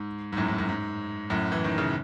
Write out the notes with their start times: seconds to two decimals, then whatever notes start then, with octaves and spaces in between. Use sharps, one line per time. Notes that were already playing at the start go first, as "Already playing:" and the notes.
Already playing: G#2
0.32 G#2
0.37 F#2 A2
0.48 G#2
0.58 F#2
0.69 G#2
1.30 F#2 A2
1.52 E3
1.64 D#3
1.78 C#3